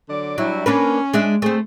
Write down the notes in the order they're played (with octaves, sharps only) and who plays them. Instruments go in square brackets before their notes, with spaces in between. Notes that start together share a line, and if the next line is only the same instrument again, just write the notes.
[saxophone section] D3 F#3 D5
[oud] F#3 [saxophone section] G3 D4 E4
[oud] A#3 D4 B4 [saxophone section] C#4
[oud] G#3 D4 E5
[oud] A3 C5 [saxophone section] C4 G#4